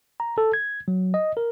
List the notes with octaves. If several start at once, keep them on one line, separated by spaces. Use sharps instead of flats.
A#5
A4
G#6
F#3
D#5
A#4